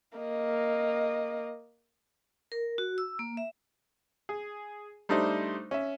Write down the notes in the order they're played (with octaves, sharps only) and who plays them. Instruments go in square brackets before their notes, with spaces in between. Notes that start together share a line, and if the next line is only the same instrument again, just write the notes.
[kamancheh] A#3 D#5
[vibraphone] A#4
F#4
E6
A#3
E5
[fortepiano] G#4
G3 A3 D4 D#4 C5
C#4 E5